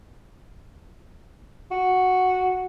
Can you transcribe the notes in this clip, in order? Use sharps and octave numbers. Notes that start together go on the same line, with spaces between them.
F#4